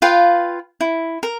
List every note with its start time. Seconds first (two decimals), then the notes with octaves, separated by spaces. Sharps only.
0.02 F4 B4 F5 G5
0.81 E4
1.23 A#4